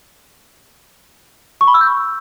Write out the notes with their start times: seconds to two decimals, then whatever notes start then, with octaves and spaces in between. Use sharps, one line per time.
1.61 C#6
1.67 B5
1.74 E6
1.81 G6